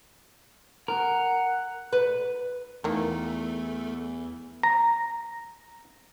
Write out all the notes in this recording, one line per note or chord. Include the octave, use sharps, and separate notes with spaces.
A#4 F#5
B4
E2 D#3 A3 A#3
A#5